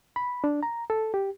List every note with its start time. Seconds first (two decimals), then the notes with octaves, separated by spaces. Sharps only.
0.16 B5
0.44 D4
0.63 A#5
0.90 A4
1.14 G4